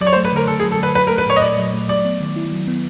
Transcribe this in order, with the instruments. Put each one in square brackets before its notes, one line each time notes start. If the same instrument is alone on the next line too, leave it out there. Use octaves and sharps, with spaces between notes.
[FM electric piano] F#3 [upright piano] D5
[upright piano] C#5
C5
[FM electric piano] A3
[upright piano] B4
[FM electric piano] D3 [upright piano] A#4
[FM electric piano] D3 [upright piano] A4
[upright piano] G#4
[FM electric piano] F#3
[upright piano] A4
[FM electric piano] A3 [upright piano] B4
[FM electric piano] F#3 [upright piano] B4
[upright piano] A#4
[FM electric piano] A3
[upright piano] B4
[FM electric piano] A#2 [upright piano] C#5
[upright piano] D#5
[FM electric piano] A#2 [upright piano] D5
[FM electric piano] F#3
A3
[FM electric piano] F#3 [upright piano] D5
[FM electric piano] B3
D#3
E4
F#3
B3